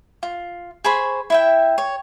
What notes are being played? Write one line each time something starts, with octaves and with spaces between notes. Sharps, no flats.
F4
G#4 C5 B5 C#6
E4 E5 G5
C#5